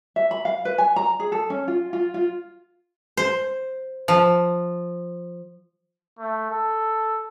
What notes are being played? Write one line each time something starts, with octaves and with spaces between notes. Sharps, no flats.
E5
B5
F5
B4
G#5
A#5
G#4
A4
C#4
F4
F4
F4
C5
F3
A3
A4